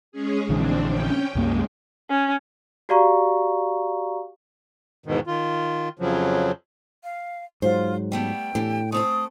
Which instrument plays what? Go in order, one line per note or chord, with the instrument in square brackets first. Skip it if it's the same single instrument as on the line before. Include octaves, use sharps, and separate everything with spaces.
[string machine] G#3 C#4 G#4
[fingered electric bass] A#1 D3 E3 [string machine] C4 D4
[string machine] C#4 G5
[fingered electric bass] C2 F#2 A#3 [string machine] G#3
[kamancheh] C#4
[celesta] F#4 G4 D5 F5 A#5 C#6
[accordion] E2 G#2 B2 D#3
D#3 F4
F2 C#3 F3 F#3
[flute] F5
[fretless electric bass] G#2 F#3 [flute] F4 [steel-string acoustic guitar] C5
[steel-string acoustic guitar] G3 A3 B3 [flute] G5
[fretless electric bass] A2 [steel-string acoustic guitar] E3 D4 G4
[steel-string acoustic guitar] A3 C4 A4 [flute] D#6